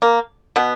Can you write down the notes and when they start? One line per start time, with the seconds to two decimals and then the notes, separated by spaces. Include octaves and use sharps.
0.02 A#3
0.56 B2 B3